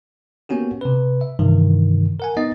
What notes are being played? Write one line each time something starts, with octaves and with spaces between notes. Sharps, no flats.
A#3 B3 C#4 F#4 G4
C3 B4
E5
G2 C3 D#3 E3
A#4 F#5 G#5
B3 D#4 D#5 A6